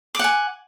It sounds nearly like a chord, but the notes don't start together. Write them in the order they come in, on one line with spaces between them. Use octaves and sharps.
D6 F#5 G#5